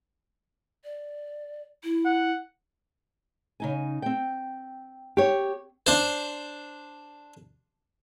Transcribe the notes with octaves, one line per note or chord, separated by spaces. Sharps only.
D5
E4
F#5
C#3 D#4 G#5
C4 G5
G4 C#5
D4 C5